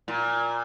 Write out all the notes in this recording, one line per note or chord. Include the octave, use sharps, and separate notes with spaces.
A#2